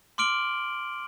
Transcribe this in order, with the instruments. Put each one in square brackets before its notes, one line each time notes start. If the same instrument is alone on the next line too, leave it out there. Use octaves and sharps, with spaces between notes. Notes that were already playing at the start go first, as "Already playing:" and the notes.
[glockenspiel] C6 D6 F6 D7 F#7 G7